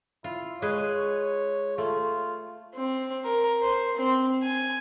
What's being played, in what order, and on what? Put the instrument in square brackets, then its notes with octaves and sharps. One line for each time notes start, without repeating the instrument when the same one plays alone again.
[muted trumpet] E4 [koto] F4
[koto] G#3 G#4 B4 [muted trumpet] C#5
[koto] A3 [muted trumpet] F4
[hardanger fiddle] C4
A#4
C5
C4
G#5